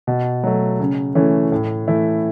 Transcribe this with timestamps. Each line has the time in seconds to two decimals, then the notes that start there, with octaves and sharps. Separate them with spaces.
0.07 B2
0.44 F#3 A3
0.80 C#3
1.15 E3 A3 C#4
1.52 A2
1.88 E3 A3 E4